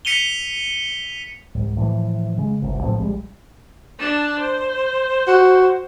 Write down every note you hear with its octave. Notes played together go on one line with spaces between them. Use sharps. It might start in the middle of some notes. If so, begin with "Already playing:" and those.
B6 C#7 D#7 F7 G7
C2 G#2
A2 E3 F3
C#3 G#3
G1 C2
B1 A2 F3 C4
A#1 F#2 G3 G#3
D4 A5
C5
F#4